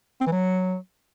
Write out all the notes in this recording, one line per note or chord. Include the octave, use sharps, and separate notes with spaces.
C4
E3
F#3